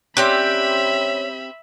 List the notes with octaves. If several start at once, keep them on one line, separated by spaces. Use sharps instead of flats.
C4 C#4 G4 D5 E5 B5 F#6